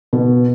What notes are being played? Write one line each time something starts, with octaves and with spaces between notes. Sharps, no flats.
B2